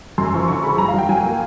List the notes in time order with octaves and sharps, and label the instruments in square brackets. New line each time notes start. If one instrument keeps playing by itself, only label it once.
[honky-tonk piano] F#2 C6
F3 C#6
D3 C#6
G#3 B5
F#3 A#5
F5
F#3 G5
F#3 G#5
A#3